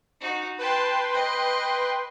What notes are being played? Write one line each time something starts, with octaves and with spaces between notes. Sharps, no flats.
D#4 F#4
B4 G5 A5 C6
D#5